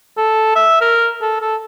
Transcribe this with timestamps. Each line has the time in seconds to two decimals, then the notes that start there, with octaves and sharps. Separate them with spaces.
0.17 A4
0.55 E5
0.81 A#4
1.21 A4
1.41 A4